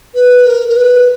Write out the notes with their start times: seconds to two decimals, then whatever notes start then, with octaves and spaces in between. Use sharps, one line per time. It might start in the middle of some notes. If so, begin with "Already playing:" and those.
0.15 B4
0.46 A#4
0.68 A#4
0.77 B4